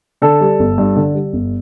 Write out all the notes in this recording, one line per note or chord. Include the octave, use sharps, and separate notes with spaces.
D3 A4
G3
G1
G2
D3
G3
G1